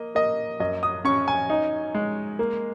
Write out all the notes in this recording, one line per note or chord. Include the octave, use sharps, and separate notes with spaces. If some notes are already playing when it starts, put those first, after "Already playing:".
Already playing: A#3 D#5
A#3 D#5
F#2 D#5
D#6
C#4 C#6
G#5
D#4
G#3
A#3